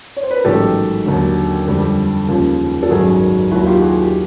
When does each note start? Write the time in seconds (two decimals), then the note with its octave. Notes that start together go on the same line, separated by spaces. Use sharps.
0.17 C#5
0.23 C5
0.31 B4
0.38 A#4
0.45 A1 G#2 D#3 F#3 G4 A4
1.06 D#2 D3 F#3
1.67 F2 D3 G3
2.28 D#2 C#3 F3
2.83 A4
2.90 G#1 F#2 D#3 F#3 F#4 G#4
3.51 D#2 D#3 F#3 E4 F#4
3.66 F4 G4
3.81 F#4 G#4
4.01 G4